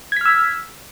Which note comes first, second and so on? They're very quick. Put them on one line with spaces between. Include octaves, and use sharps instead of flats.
G#6 B6 F6 E6